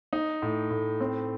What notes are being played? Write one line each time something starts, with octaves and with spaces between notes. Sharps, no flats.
D#4
A2
A2
C4